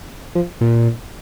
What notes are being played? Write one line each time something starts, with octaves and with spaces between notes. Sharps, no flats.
F3
A#2